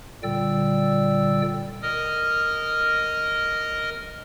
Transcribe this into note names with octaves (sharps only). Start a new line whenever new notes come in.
A#2 D3 G3 D5 G5 E6
A#4 D#5 D#6 F6